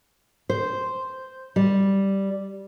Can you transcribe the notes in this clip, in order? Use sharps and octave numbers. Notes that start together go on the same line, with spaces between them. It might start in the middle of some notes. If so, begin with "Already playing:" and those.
C5
G3